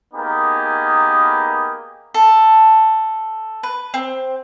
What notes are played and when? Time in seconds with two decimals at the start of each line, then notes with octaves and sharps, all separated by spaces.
0.14 A#3 B3 D#4 G4 G#4 A#4
2.14 A4
3.63 B4
3.94 C4